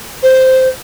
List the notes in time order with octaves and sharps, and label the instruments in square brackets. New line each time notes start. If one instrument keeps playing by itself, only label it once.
[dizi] C5